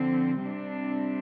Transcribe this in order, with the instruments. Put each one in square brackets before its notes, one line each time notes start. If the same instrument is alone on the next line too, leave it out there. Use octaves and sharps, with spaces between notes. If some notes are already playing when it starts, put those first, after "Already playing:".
Already playing: [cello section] D3 F3 C4
C3 G3 C4 D4